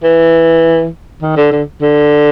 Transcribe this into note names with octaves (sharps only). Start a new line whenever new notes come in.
E3
D#3
D3
D3
D3